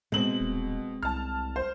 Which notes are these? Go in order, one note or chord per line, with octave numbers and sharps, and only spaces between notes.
B2 G#3 C4 F#7
D#1
C2 A5 F6
C5